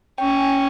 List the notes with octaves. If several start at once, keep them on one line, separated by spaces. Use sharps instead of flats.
C#4 G5
G#5
G5